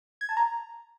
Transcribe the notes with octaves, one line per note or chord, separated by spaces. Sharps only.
G#6
A5
A#5